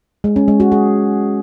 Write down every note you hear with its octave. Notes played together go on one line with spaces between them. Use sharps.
G#3
C#4
G#3
F#4
G#4